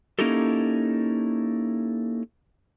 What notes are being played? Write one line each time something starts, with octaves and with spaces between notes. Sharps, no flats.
A#3 C#4 D#4 E4 G4 A4